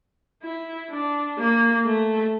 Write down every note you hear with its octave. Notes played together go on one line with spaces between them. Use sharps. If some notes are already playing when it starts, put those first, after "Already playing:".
E4
D4
A#3
A3